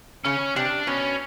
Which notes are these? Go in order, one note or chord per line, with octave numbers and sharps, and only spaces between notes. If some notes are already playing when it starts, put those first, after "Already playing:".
C#3 C#4
C3 D4
B2 C#4